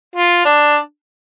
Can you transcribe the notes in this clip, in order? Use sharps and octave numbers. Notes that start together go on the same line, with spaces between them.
F4
D4